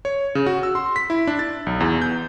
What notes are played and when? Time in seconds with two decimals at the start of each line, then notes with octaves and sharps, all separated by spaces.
0.05 C#5
0.35 C#3
0.46 F#4
0.63 E6
0.75 C6
0.96 B6
1.10 E4
1.27 D4
1.39 A6
1.66 B1
1.80 E2
2.02 G6